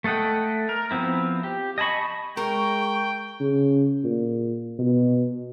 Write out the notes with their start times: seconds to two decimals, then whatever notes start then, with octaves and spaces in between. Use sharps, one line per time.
0.04 A3 A4 D#5 F#5 G5
0.69 A#4
0.91 F3 B3 C4 E4
1.44 G4
1.78 D#5 G#5 A5 B5 C#6
2.37 G#3 A#4 G5 C#6
3.40 C#3
4.04 A#2
4.79 B2